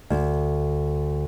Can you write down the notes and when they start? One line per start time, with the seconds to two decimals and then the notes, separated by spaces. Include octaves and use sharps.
0.10 D2